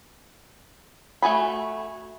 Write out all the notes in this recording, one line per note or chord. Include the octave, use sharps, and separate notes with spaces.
A3 F#4 G#5 B5